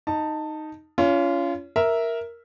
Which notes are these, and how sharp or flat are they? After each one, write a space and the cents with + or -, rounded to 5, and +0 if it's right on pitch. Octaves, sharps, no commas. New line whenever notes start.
D#4 +0 A5 +15
C#4 +25 F4 -25
A#4 +0 E5 -5